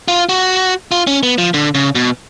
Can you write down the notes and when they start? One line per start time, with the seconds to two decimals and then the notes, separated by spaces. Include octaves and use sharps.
0.08 F4
0.29 F#4
0.91 F4
1.07 C#4
1.23 B3
1.38 F3
1.54 D3
1.75 C#3
1.95 B2